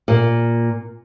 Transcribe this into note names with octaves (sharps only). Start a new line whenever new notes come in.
A#2